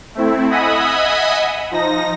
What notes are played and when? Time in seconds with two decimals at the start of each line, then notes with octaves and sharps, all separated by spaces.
0.15 A3 C4 E4
0.50 D#5 E5 F#5 G#5 B5 D#6
1.71 F3 D#4 A#6